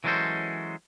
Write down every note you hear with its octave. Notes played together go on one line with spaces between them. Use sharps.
E3 F#3 G#3 C#4 A4 C5